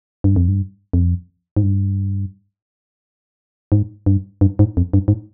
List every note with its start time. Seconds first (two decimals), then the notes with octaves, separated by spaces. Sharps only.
0.24 G2
0.36 F2
0.48 G2
0.93 F2
1.57 G#2
1.63 G2
3.72 G#2
4.06 G2
4.41 G2
4.59 G#2
4.77 F2
4.93 G2
5.08 G#2